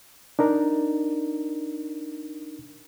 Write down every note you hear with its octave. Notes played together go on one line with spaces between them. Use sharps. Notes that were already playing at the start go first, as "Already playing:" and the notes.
D4 D#4 A#4